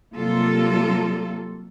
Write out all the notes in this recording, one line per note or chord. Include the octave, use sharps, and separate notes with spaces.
C3 F#3 G3 A#3 F4 A4